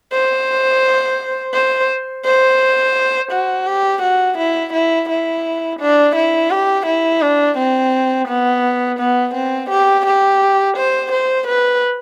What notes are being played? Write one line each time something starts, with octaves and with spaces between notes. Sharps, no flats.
C5
C5
C5
F#4
G4
F#4
E4
E4
E4
D4
E4
G4
E4
D4
C4
B3
B3
C4
G4
G4
C5
C5
B4